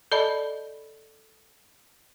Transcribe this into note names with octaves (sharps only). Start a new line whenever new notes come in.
A4 D5 D#5 A5 B5